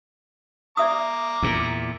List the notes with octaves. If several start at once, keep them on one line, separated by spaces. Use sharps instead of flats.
D5 E5 A#5 D6 D#6
E2 A#2